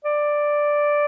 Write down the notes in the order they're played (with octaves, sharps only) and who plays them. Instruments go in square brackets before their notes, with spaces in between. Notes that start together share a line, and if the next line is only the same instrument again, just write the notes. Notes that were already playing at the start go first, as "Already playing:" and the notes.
[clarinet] D5